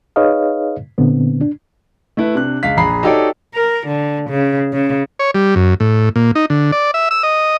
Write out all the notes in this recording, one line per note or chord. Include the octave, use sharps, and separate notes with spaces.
D#4 G#4 B4 C#5 D#5 F5
A#2 D3 B3 C4
D4
A3 E4 B4
C3 D4 F#6
C#2 F5 B6
A#1 G#4 A#5 B5 C7
D#4 F#4 G4 A4 C#5 D5
A#4
D3
C#3
C#3
C#5
G3
F#2
A2
A#2
D#4
D3
D5
E5
E6
D#5